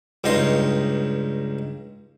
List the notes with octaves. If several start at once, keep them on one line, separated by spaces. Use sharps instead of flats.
C#2 G2 D#4 D#5 C6